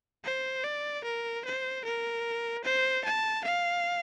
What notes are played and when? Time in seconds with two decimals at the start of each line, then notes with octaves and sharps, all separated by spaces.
0.25 C5
0.64 D5
1.04 A#4
1.45 C5
1.85 A#4
2.64 C5
3.04 A5
3.44 F5